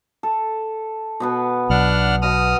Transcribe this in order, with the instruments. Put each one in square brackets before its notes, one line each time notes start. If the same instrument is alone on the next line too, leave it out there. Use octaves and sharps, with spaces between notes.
[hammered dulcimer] A4
B2 B3 B4
[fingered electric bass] B1 [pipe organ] D4 F#5 F6
[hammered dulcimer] B2 D#5 F#5 [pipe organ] D#6 F6